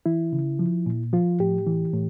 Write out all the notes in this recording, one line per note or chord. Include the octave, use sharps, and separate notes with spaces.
E3 E4
C#3
F3
A#2
F3 F4
A2 G4
E3
A2